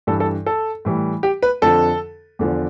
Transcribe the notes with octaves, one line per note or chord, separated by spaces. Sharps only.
G2 E3 G3 A4
A4
A4
A2 E3 G3
G4
B4
F2 D3 F3 A4
E2 D3 F3